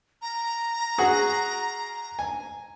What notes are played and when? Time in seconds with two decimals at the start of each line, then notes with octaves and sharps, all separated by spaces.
0.22 A#5
0.98 F#4 G#4 F#5
2.19 G#5